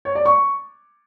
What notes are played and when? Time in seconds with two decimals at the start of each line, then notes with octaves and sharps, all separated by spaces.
0.05 C#5
0.15 D5
0.26 C#6